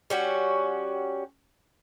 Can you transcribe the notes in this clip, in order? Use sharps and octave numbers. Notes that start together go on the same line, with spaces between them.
G3 C#4 F#4